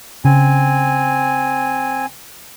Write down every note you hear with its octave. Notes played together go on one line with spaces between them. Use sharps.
C#3 C4 G#5